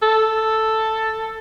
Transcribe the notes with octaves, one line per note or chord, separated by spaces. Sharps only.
A4